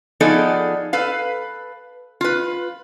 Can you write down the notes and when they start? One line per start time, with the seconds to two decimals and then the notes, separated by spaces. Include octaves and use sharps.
0.20 F3 B3 D#4 G#4 A4 D5
0.93 A4 B4 F5
2.21 F4 B4